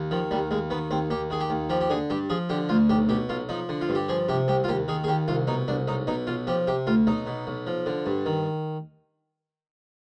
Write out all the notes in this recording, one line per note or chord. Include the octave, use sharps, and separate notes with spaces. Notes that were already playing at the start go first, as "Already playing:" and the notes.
Already playing: D#2
D#3 F3
D#2 G3
D#2 G#3
D#3 B3
D#2 C4
D#2 G4
D#3 G#4
G4
D#2
F3 G4
G4
D3 G#4
G2 G4
F3 G#4
D3 G4
D2 F4
B1 G4
B2 G4
B1 F4
F3 D#4
D3
F4
G2
G4
F3 G#4
C3 G4
C2 G4
F4
D#2 G4
D#3 G#4
G#4
D#2 G4
C2 F4
B2 D#4
C2 D4
B1 D#4
B2 D#4
B1 F4
F3 G4
C3 G4
D2 F4
B1 D#4
B2
B1
F3
D3
G2
D#3